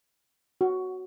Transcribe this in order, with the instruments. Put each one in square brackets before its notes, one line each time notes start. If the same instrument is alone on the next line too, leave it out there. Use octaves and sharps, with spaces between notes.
[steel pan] F#4